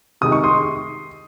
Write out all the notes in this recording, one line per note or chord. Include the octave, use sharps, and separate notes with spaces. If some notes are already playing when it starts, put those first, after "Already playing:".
C3 D#3 G#3 D#4 D#6
C#6
C6 D#6